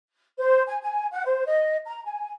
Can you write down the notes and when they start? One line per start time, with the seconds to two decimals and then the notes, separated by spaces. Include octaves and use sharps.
0.39 C5
0.67 G#5
0.81 G#5
1.12 F#5
1.25 C5
1.45 D#5
1.86 A#5
2.04 G#5